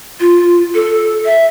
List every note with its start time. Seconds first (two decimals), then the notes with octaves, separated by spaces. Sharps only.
0.20 F4
0.75 A4
1.25 E5